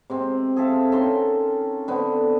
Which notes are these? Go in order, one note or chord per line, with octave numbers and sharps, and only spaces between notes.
C3 G#3 C4
G#4 A4 E5 F5
D#3 C#4 A4 C6
D3 B3 C4